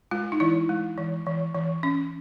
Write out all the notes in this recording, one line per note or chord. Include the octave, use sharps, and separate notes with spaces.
G#3 F4
D#4
E3 E4
G#3
E3
E3
E3
C#4